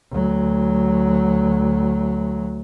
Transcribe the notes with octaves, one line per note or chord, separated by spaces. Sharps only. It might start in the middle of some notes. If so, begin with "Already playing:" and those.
D2 F#3